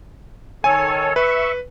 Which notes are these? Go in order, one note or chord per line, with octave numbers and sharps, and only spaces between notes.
D#3 A4 C#5 G#5
B4 E5 C#6